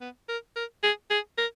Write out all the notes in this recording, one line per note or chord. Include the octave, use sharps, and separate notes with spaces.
B3
A#4
A#4
G#4
G#4
A#4